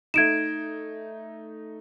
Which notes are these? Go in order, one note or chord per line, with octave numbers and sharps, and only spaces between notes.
A3 D#4 G#6 D7 E7